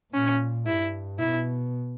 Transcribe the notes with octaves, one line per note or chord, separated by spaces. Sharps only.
A#2 C#4
G2 E4
B2 E4